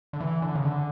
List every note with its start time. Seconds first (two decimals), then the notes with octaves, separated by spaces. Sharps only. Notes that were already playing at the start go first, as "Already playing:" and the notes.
0.13 D3
0.21 E3
0.42 D3
0.55 C#3
0.65 D3